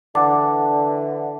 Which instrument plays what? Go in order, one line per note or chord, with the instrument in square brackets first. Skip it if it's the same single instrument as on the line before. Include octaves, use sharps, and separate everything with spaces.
[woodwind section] D3 E3 [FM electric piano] F#5 A5 [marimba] D6